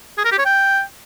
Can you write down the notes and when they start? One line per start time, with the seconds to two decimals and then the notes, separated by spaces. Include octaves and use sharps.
0.18 G#4
0.25 A#4
0.32 G4
0.39 C#5
0.45 G5